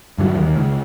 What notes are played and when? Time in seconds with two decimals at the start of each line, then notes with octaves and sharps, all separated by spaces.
0.18 G2 D3 F#3
0.35 D#2
0.57 C#2